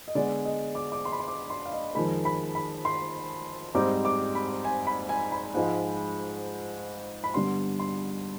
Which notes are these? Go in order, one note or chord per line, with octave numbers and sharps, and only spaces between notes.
D#5
D3 G#3 B3 D4 D5
D#5
D6
D6
C6
B5
C6
D6
C6
F5
D#5
F2 D#3 G#3 B5
B5
B5
C6
G#2 G3 C4 D#4 D6
D6
B5
G#5
B5
G#5
B5
G#2 F3 G#3
B5
G2 D3 G3 B3 C6
C6